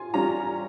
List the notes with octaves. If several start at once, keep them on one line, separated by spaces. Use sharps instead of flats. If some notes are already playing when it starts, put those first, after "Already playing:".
Already playing: F4 G#5 C6
G3 C#4 F4 A#5